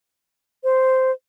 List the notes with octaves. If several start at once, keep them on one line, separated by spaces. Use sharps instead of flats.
C5